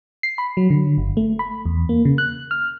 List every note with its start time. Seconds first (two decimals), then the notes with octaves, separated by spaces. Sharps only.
0.23 C7
0.38 B5
0.57 F#3
0.70 D3
0.98 G1
1.17 A3
1.39 B5
1.66 E2
1.89 A#3
2.05 C#3
2.18 F#6
2.51 F6